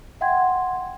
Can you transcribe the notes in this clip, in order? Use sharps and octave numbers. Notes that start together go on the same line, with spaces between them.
E5 F#5 G5 C6 G#6